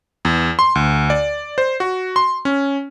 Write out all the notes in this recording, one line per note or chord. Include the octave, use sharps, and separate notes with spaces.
E2
C6
D2
D5
C5
F#4
C6
C#4